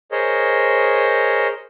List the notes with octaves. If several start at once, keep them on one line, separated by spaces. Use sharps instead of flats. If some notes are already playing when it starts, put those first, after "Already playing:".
G#4 A#4 C5 C#5 D#5